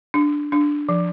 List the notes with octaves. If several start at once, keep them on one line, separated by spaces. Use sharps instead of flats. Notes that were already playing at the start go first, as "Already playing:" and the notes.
D4
D4
F3